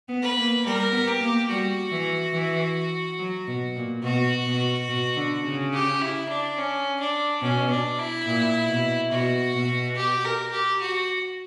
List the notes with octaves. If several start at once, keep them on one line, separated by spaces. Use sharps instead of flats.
B3
B4
A#3
G3 A#4
B3
G4
A#3
G3 F#4
E3
E3
F#3
B2
A#2
B2 F#4
B2
B2
D3
C#3
G4
E4
D4
C#4
D4
B2 C#4
D4
E4
A#2
B2
B2 F#4
B2
G4
A#4
G4
F#4